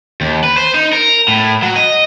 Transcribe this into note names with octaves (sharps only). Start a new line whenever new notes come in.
D#2
B4
C5
D#4
A#4
A2
F#3
D#5